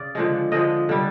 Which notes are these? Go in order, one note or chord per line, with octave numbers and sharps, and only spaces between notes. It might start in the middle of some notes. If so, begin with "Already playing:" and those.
Already playing: C#3 D5
D3 F3 G#3
D3 F3 G#3 D#5
D3 G3